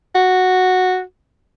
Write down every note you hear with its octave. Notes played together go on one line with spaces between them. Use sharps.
F#4